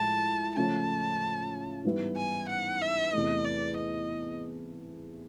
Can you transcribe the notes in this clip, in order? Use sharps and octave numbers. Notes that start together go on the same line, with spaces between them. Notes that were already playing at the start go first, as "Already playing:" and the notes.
Already playing: A2 F3 G#3 A5
C#3 F3 A3 C#4 A5
G#2 E3 G3 B3 E4
G#5
F#5
E5
E2 C3 E3 A3 D#5
D5
D#5